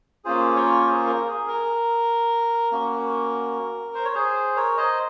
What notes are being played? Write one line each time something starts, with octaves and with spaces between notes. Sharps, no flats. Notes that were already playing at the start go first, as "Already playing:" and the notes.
A#3 C#4 F4 G#4 C5
A#4 C#5
G#4 C5
A#4
G#4
A#4
A#3 C#4 F#4
C5
C#5
G#4 C5
A#4 C#5
C5 D#5